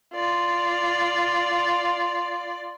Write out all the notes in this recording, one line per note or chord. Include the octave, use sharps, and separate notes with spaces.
F4 D5